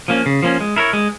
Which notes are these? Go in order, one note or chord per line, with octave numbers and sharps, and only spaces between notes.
F3 A#3 C#4
C#3
F3 A#3 C#4
G#3
E4 A#4 C#5
G#3